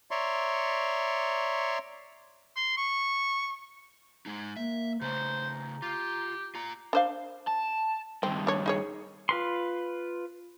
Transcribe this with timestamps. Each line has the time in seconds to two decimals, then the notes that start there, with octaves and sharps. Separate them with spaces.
0.11 C#5 D5 E5 A#5 C6 C#6
2.56 C6
2.77 C#6
4.26 G#3 D#4
4.57 A#3 E5
5.01 C#3 A3 C5 A#5
5.82 F4 G4
6.55 F4 A#5
6.93 D4 C5 F5
7.48 A5
8.23 G2 D#3 C4
8.47 D4 C#5
8.66 D#4 G#4 C#5
9.29 F4 B4 C6